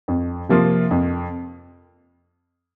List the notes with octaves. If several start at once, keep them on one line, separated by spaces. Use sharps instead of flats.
F2
C3 F3 A#3 F4
F2